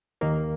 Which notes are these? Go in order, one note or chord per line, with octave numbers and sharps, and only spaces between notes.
D#2 D#3 A#3